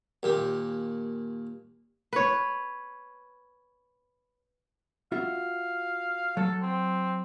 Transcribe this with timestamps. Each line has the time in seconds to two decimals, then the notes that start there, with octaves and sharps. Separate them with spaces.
0.23 D#2 A#2 G4
2.13 B4 C#5
5.12 F4 F#4 E5 F5
6.37 F#3 A4
6.62 C4